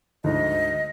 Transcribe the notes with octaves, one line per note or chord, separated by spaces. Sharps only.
D2 G#2 D#5